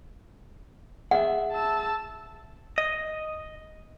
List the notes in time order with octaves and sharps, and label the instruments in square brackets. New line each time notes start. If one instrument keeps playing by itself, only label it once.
[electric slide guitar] G#4 E5 [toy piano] F#5
[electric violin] A5 E6
[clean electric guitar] D#5